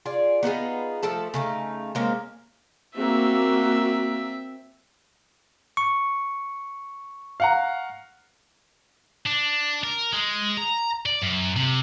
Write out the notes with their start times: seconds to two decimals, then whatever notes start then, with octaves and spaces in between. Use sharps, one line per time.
0.06 F4 G#4 D5
0.43 B3 D#4 F4 G#4
1.03 F3 A3 A4 A5
1.34 C#3 A3 D#4
1.95 G#3 A#3 C4 C#4
2.96 A#3 C4 F#4 E5
5.77 C#6
7.40 F5 F#5 A#5
9.27 D4
9.84 A#4
10.13 G#3
10.57 A#5
11.06 D5
11.22 F#2
11.56 C3